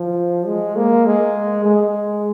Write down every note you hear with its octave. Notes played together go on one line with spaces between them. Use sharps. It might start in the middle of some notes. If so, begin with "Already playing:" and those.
Already playing: F3
G#3
A#3
G#3
G#3